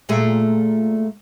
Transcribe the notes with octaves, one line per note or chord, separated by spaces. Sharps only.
A#2 A3 G#4